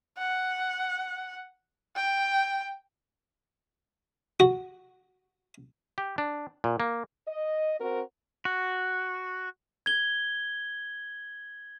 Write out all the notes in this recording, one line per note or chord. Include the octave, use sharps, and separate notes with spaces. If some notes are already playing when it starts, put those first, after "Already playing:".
F#5
G5
F#4
G4
D4
A#2
A#3
D#5
C4 F#4 A#4 C5
F#4
G#6 G7